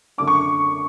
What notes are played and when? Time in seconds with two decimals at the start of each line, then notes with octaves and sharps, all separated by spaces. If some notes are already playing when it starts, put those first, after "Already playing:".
0.18 F#2 D3 A3 D4 D6
0.27 C#6